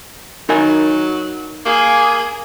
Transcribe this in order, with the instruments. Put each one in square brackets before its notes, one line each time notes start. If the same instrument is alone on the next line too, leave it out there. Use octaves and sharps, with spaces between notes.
[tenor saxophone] F#3 [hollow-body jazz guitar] D#4 A#4 G#5
[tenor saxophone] A#3 [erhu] G#4